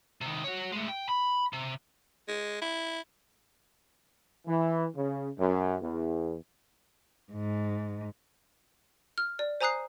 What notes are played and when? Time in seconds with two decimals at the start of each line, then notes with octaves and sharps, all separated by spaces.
0.21 C3 D#3
0.44 F#4 C#5
0.72 G#3 A3
0.88 G5
1.09 B5
1.53 C3
2.28 G#3
2.61 E4
4.46 E3
4.95 C#3
5.38 F#2
5.82 E2
7.32 G#2
9.18 F6
9.39 D5
9.61 C5 G#5 A#5 D#6 F#6 C7